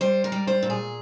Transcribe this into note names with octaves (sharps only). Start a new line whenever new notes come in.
G3 C5
A#4
G3
C5
A#2
G#4